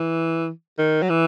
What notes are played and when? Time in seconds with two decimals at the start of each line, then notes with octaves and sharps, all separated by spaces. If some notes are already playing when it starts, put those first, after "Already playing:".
Already playing: E3
0.78 D#3
1.02 F#3
1.10 E3